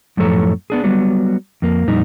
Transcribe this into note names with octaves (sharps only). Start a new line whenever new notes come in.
F#2 A2 F3 A4 C#5 A#5
B3 D4 G#4
F#3 G3 B3
F2 A#3
F2 A#2 G3 D#4